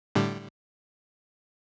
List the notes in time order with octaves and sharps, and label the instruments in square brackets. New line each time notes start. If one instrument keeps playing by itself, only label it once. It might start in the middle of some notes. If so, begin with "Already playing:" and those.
[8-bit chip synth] A2 D3 G3